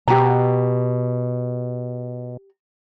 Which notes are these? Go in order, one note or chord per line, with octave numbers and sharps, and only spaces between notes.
B2 G4 A#5